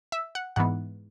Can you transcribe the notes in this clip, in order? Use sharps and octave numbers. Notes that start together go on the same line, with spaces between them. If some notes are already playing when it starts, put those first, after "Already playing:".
E5
F#5
G#2 E3 B3 F#5